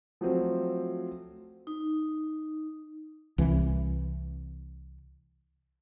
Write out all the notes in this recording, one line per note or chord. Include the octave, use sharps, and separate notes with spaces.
F3 F#3 A3 C4
D#4
C2 E3